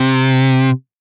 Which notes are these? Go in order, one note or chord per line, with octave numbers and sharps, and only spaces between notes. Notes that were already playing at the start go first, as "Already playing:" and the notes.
Already playing: C3